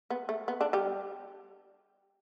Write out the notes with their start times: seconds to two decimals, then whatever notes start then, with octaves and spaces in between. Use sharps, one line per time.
0.10 B3
0.29 A3
0.48 B3
0.61 D3 D4
0.73 G3 G4